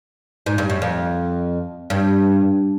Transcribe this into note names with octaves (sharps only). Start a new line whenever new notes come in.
G#2
G2
F#2
F2
G2